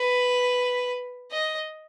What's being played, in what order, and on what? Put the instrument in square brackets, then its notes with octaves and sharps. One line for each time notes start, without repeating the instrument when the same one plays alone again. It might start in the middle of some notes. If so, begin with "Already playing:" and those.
Already playing: [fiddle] B4
D#5